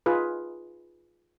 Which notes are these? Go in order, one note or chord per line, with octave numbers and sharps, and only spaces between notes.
D#4 F4 G#4 B4